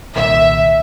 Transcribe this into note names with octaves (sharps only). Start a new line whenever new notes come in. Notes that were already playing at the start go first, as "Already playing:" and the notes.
C2 A#2 D#3 E5